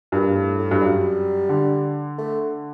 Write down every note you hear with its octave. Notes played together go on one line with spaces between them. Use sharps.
G2 A#2
A2
A2
G2
F#2 G3
D3
A3